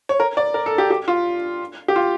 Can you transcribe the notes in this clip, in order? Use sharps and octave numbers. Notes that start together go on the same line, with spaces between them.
C#5
A#4
D5
A#4
A4
G4
G4
F4
G4
F4